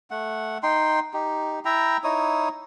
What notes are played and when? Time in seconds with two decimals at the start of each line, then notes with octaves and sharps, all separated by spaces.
0.11 A3 F#5
0.63 D#4 G5 C6
1.13 D#4 G4
1.65 E4 E5 G5 A#5
2.04 D#4 E4 C#5 D#6